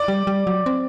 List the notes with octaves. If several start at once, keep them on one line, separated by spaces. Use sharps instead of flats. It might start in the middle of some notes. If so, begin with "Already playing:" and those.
Already playing: D5
G3
G3
F#3
C4